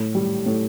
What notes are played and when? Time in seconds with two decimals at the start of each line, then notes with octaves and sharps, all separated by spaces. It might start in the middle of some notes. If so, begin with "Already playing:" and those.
Already playing: A2
0.15 G3
0.46 A2